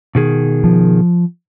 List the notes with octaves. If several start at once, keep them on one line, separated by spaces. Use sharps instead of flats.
B2 D#3 G#4
F3